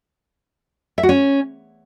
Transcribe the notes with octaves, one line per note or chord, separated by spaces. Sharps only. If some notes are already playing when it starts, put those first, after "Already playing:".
E5
F#4
C#4